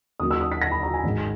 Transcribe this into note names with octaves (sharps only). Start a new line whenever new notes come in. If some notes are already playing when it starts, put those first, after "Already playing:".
D#2 C#3 F#3 A#3 D#6
E6
D#6
B6
A#6
B5
A#5
G#5
G#1 G#2 D#3